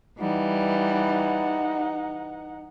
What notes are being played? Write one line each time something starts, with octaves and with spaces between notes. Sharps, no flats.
E3 G3 D#4 F#5